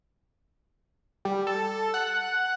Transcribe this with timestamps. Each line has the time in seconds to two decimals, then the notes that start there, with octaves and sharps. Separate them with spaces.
1.25 G3
1.47 A4
1.94 F#5